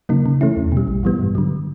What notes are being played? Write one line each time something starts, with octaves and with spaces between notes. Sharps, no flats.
C#3 F#3 A#3 D#4
C#3
E3 A3 C#4 E4
E2
B2 G3
A#1
A2 E3 G3 B3
G2
D3 F#3